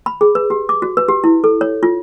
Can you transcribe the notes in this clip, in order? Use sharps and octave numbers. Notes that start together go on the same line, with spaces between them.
B5
G#4
B4
G4
D6
F#4
B4
G4
E4
A4
C#5
F4